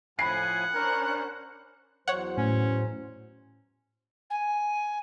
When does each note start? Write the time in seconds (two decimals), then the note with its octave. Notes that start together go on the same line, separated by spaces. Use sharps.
0.19 A2 F3 F#5 G#5 B5 C7
0.75 C#4 D4 A#4 C5
2.08 E2 F#3 C5 C#5 F#5
2.37 A2 C#4
4.30 G#5